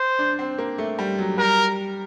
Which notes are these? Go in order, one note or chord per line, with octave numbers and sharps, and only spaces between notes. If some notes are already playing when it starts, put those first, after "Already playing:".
Already playing: C5
D4
C4
A#3
A3
G3
F#3
G3 A#4